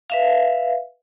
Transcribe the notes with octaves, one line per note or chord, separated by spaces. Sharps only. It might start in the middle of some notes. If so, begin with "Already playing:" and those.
B4 E5 F5